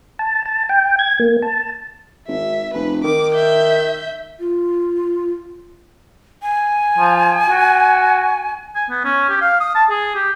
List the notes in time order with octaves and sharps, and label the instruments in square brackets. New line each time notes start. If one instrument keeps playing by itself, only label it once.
[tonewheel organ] A5
A5
G5
G#6
A#3
A5
[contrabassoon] G#1 [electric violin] E5
[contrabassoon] F1 [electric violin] B4
[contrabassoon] D#3 [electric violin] D6
[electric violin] E5 G6
[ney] F4
[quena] G#5
[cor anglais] F3
F#4
[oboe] G#5
B3
C#4
G4
F5
D#6
A5
G#4
G4